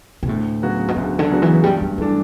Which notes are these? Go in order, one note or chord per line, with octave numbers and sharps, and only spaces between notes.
B2
D2 A2
C#3 F#3 B3 F#4
B2
D2 A2
D3
C#3 F#3 B3 F#4
E3
G2 G3
A3
E3 G3 A3 D4